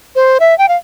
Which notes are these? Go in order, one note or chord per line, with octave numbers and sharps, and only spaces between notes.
C5
E5
G5
F5